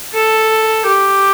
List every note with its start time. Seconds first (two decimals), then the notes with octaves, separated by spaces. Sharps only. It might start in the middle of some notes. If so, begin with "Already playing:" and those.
0.14 A4
0.86 G4